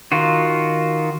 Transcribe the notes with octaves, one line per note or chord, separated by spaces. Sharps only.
D#3 F4 F#4